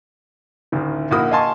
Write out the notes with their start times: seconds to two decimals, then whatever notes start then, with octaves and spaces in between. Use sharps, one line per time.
0.72 A1 D2 D#3
1.11 A#1 A#3 E4 F#4 D#6
1.31 D#5 F5 G#5 A5 C6 C#6